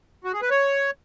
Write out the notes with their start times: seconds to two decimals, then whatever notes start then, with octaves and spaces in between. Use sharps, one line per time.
0.24 F#4
0.33 G#4
0.42 B4
0.50 C#5